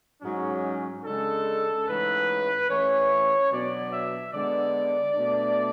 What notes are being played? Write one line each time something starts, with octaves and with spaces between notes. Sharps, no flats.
G#2 F#3 C#4
C#3 G#3 D4 A4
G#2 E3 A3 C#4 B4
E3 A3 C#4 C#5
B2 F#3 B3 D4 D5
E5
D3 G#3 B3 D5
B2 A3 D4